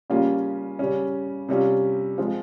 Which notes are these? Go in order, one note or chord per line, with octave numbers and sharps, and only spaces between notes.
C#3 G3 A#3 C#4 F4
C#3 G3 C#4
C3 G3 C#4 F4
F3 G#3 C4 F4